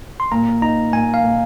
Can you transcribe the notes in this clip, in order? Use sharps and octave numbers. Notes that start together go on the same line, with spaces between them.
C6
A#2 A#5
D#4 A#5
A#2 G#5
F5
A#2